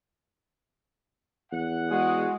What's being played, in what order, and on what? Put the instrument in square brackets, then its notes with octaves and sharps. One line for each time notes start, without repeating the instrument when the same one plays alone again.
[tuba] E2 [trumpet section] F#5
[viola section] G#3 [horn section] F#4 G#4